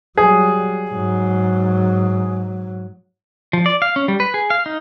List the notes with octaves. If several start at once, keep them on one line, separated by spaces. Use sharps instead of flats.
F#3 G3 G#4
G#2 F#3
F3
D5
F5
C#4
G3
B4
G#4
F5
D#4